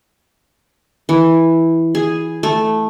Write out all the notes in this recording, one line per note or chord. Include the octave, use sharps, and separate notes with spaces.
E3
G#4
A3